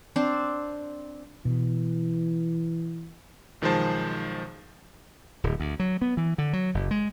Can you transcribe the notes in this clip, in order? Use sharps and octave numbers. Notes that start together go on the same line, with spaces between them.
C4 D4 C5
B2 E3
B1 D#3 F3 G#3 C5 A5
D1
D2
F#3
B3
E3
D3
F#3
F#1
G#3